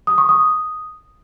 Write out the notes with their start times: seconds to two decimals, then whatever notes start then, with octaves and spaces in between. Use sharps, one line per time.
0.07 D#6
0.18 C#6
0.29 D#6